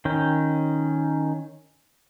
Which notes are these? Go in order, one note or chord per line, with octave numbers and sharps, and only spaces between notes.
D#3 C#4 G5